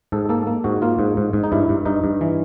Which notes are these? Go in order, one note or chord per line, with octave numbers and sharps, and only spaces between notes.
G#2 A4
A#3 A4
A#3
G#2 F#4
A#3 F4
G#2
G#2
G#2
D#4
G2 E4
G2
G2 D#4
G2
E3